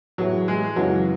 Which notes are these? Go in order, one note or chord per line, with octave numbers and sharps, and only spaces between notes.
A2 E3 F#3 B3 E4 G#4
G#3
F#2 C#3 E3 F#3 B3 F#4